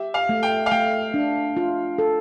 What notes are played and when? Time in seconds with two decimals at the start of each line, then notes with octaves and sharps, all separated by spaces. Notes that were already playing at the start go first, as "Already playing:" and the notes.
Already playing: G4 E5
0.14 F5
0.29 A3
0.43 G5
0.66 F5
0.71 A3 G5
1.14 D4
1.57 F4
1.98 A4